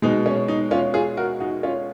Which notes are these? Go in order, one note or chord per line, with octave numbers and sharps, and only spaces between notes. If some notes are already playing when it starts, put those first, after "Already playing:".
B2 G#3 D#4
C#4
D#4
C#4 F4
F4 G#4
F#4 A#4
D#4 F#4
C#4 F4